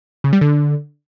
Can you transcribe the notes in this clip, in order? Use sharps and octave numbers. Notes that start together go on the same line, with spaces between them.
C#3
G3
D3